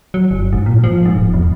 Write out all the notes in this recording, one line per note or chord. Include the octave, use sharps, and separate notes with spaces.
F#3
G1
G#2
A#2
F3
G#2
D1
E2